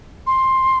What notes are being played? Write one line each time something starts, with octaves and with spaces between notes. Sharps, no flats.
C6